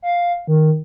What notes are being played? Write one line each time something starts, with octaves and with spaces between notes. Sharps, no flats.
F5
D#3